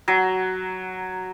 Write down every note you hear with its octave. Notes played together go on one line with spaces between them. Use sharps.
F#3